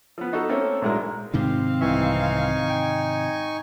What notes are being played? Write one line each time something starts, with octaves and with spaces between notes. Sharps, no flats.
F3 B3
D#4 F#4 A4
A3 A#3 C4 C#4 A4
A#1 G#2 F#3 G#3 E4 A#4
G#2 C3 D#3 C4 G4 F5
C2 E3 D#4 E5 G#5 C#6
G5